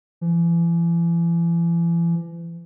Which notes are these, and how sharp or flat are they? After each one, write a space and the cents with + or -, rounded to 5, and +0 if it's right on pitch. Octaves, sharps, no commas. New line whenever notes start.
E3 +40